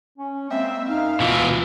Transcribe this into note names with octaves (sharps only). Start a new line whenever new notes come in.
C#4
G#3 A#3 C4 E5
F#2 D#4 F5
D2 B2 E3 F4